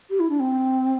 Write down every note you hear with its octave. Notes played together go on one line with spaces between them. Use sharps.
G4
E4
D4
C4